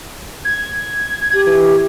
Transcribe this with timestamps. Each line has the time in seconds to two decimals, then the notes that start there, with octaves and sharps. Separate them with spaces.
0.45 G#6
1.34 G4
1.47 E3